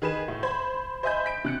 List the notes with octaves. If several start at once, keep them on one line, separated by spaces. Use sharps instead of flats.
D#3 G#4 B4 D#5 E7
A2
C5 B5 G#6
C5 D#5 E5 G#5 B5 G6
B6 D7
C3 F#6 C#7